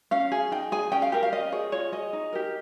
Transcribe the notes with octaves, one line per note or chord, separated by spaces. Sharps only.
C#4 F5
G#4
D#4 G5
G#4 G#5
C#4 G5
F5
G4 A#4 G5
F5
C#4 D#5
G#4 C#5
F4 C#5
G#4 D#5
D#4
G4 A#4